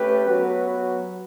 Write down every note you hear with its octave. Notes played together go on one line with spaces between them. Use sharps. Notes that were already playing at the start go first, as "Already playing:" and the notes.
Already playing: A3 C#4 G4 B4
F#3 B3 F#4 B4